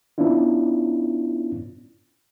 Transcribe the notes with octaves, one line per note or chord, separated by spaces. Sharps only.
B3 C#4 D4 E4 F4